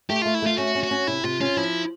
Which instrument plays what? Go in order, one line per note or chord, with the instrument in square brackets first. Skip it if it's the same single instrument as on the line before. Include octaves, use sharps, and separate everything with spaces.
[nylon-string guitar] A3 [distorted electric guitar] G4
[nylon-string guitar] A3 [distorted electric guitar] F4
[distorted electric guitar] E4
[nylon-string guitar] A3 [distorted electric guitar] F4
[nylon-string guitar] C#4 [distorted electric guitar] F#4
[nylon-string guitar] C#4
[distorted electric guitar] F#4
[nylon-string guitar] C#4
[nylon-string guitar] C3 [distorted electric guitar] E4
[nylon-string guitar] C3 [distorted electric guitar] F4
[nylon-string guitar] C#4 [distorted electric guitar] F4
[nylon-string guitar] F3 [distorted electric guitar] E4